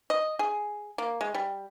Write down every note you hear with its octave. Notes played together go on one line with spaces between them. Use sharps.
D#5
G#4
A#3
G#3
G3